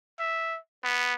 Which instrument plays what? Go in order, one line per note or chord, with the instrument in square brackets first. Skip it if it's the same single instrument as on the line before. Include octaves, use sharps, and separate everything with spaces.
[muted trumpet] E5
B3